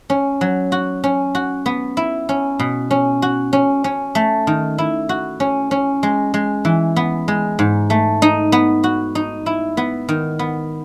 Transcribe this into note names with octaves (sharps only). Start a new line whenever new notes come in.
C#4
F#3
F#4
C#4
F#4
B3
E4
C#4
B2
C#4
F#4
C#4
C#4
A3
D#3
E4
F#4
C#4
C#4
G#3
G#3
E3
B3
G#3
G#2
A3
D#4
B3
F#4
D#4
E4
B3
D#3
B3